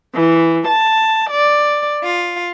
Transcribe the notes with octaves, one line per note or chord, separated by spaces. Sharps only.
E3
A5
D5
F4